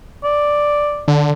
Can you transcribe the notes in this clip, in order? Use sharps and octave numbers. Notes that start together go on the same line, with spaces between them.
D5
D3